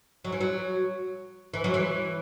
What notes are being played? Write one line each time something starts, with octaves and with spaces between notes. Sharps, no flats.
F#3
E3
F#3
E3
F#3
E3